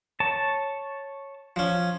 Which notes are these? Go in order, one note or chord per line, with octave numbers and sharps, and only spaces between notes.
C#5 A5
F3 C#4